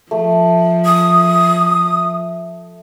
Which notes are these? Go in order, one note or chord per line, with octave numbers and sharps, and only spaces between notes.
F3 A3
D#6